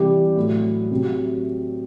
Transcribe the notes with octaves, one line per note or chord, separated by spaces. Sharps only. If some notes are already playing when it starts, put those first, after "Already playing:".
Already playing: C3 E3 G3 G4
A2 F#3
C3 F#3